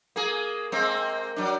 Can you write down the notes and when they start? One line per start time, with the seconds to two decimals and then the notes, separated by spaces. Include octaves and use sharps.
0.16 A#3 G#4
0.72 G#3 A#3 C4
1.36 F#3 D4